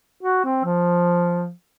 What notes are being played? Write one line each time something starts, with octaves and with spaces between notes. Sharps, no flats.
F#4
C4
F3